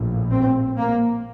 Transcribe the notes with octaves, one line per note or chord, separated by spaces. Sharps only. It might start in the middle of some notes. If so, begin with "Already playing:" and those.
Already playing: A#1 A2
C4
A#3